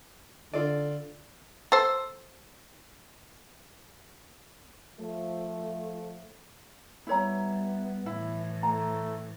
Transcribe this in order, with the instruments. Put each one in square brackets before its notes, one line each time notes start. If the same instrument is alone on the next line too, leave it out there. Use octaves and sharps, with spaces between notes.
[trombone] D3 [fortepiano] F4 A4 D5
[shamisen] A4 C5
[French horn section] F3 A3
[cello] G3 [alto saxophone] B3 [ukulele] E4 C#5 A#5
[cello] A2 E3 [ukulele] E4
[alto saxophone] A3 [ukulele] A#5